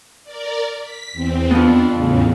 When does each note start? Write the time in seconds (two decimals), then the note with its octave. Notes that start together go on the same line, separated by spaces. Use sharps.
0.24 A#4 D5
0.80 B6
1.13 E2 C4
1.51 F2 F3 B3 D4
1.94 E2 A2 C#3